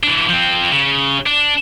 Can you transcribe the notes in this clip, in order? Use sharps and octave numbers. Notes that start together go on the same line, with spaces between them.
E3 D4
F3 C4
C#3
D4